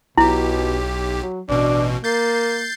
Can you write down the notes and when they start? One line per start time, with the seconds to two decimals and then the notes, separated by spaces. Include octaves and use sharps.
0.18 B1 B2 E4 G4
1.22 F#3
1.49 A1 B2 D4
2.04 A#3 G6 A6 C7